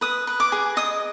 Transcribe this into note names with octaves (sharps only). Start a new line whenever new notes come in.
B4 D#6
B4
D6
G#4
D#5 D#6